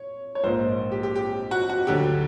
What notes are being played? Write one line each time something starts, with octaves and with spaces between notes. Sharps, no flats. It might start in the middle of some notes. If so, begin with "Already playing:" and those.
Already playing: C#5
C#5
A#1 G#2 F3 A#3 C5
G4
G4
G4
F#4
F#4
D2 D3 F#3 G4